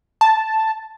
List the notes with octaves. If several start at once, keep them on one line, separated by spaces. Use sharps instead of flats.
A5